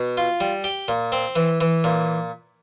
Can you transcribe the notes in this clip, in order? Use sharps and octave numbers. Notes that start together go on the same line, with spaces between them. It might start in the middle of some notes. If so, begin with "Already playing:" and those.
Already playing: B2
F4
G3
G4
A#2
C4
E3
E3
A#2